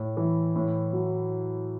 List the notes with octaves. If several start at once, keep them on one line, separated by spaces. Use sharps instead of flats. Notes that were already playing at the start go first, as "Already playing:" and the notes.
Already playing: A2
E3
A2
F#3